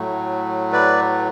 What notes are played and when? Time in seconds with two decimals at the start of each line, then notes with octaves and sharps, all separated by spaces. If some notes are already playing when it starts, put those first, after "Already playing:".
Already playing: A2 F#3 A3
0.73 B4 D5